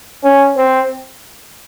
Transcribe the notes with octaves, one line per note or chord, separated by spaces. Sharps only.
C#4
C4